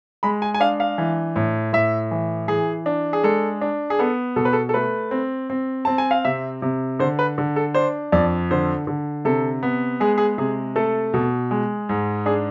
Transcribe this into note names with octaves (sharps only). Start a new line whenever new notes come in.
G#3 B5
G#5
G#5
D4 F5
F5
E3
A2
A2 E5
E3
E3 G#4
D4
G#4
G#3 A4
D4
G#4
B3 A4
B2 A4
B4
A4
A4
A3 B4
C4
C4
C4 A5
G#5
F5
C3 E5
C3
D3 C5
B4
D3
A4
D4 C5
F2 D5
D3 C5
D3
C3 A4
B3
G#3 G#4
G#4
C3 G#4
A3 A4
B2
G#3
G#2
D4 G#4